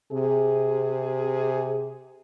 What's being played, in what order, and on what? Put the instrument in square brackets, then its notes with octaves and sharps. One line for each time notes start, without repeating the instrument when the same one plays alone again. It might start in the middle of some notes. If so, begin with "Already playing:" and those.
[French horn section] C3 G#4